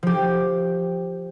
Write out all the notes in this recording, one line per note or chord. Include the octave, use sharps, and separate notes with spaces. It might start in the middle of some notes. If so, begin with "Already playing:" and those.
F3 G4